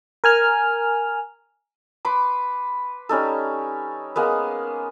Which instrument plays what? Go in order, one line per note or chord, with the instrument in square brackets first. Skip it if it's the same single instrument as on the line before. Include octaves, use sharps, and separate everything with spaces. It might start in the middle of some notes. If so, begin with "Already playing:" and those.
[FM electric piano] A#4 G#5 F6
[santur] B4 B5 C6 D6
G3 C#4 D#4 A4
G#3 A#3 B3